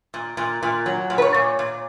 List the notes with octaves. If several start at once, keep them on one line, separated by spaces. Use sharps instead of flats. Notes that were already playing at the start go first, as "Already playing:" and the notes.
A#2
A#2
A#2
F#3
A#2
B4
C#5
A#2
A#2